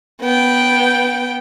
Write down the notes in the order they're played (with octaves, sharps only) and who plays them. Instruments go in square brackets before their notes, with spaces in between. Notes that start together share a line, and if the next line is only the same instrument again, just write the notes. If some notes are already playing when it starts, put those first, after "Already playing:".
[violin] B3 G5